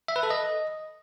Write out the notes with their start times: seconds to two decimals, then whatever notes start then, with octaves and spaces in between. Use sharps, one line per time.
0.08 E5
0.16 B4
0.23 A4
0.30 D#5